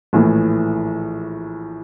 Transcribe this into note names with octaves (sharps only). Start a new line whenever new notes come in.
A#1 A2 E3